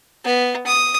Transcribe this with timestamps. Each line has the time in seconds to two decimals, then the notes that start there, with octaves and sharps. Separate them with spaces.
0.25 B3
0.67 D#6